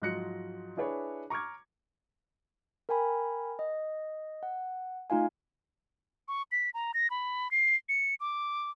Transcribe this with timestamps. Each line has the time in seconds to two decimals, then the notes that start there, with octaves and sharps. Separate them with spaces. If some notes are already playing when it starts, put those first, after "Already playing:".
0.02 G#2 F3 F#3 F#6 A#6 C#7
0.77 D4 E4 G#4 B4 C#5
1.30 A#5 C#6 D6 F6 G#6
2.89 A#4 G5 G#5 B5
3.59 D#5
4.43 F#5
5.10 A3 D#4 F4 F5 G#5
6.28 C#6
6.52 B6
6.74 A#5
6.94 A#6
7.10 B5
7.51 C7
7.89 C#7
8.20 D6